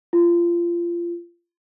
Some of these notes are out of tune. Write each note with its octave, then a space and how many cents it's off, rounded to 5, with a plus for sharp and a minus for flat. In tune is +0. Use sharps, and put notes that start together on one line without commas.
F4 -25